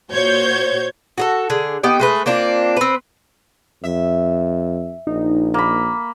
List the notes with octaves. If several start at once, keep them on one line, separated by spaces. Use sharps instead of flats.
A#2 F#4 C5 C#5 G6 G#6
F#4 G#4 A4
D3 G#4
B3 D#4 G4 G5
G#3 A3 B4
A#3 C4 D4 F4
C4 B4
F2 E5
A#1 D#4
A#3 B5